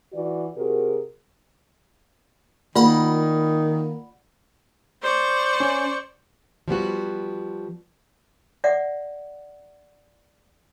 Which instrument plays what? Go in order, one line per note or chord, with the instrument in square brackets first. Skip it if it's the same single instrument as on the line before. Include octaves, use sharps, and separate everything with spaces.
[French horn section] E3 F#4 D5
C3 F#4 G#4 A#4
[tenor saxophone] D#3 [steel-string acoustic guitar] A#3 [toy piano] F4 [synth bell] D5 F#5 B5
[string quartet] C5 D5 C#6
[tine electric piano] C#4
[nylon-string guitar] F3 G3 B3 F#4
[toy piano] D5 E5 F#5